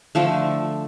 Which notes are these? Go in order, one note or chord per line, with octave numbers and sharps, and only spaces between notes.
D3 F3 A3